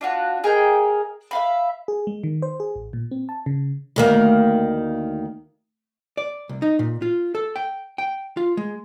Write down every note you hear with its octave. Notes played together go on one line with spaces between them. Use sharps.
D4 F4 F#4
G#4 A#4 D#5 G5
E5 F5 B5
G#4
G#3
D#3
C5
G#4
A1
A#2
C4
A5
C#3
D2 D#3 A#3
D5
C2
D#4
A#2
F4
A4
G5
G5
F4
G#3